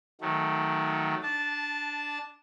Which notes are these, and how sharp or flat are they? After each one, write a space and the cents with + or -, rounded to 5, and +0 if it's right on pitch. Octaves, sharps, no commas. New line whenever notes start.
D#3 +15 F#3 +0 A3 +0
D4 +0 A5 -15